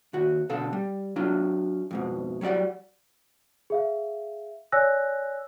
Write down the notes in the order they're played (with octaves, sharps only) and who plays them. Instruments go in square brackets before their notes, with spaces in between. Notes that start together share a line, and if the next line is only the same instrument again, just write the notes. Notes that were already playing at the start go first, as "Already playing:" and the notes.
[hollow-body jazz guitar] D#2 F#4
B2 D3 A4 F5
G3
F#3 D4 F4
F2 G#2 B2
F#3 G3 A4 D5 F#5
[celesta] G#4 E5 F5
C#5 D5 G#5 E6 F#6 A#6